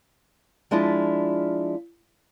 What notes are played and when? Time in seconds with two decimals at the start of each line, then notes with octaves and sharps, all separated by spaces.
0.71 F3 G#3 D4 E4 F4